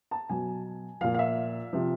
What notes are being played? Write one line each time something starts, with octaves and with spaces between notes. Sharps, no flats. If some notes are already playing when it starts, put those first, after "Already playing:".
A5
B2 F#3 G#5
A#2 F3 F5
F5
E5
C3 F3